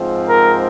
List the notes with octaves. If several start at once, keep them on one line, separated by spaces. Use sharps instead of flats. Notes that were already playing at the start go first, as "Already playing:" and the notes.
Already playing: G#2 F3 C4
A#4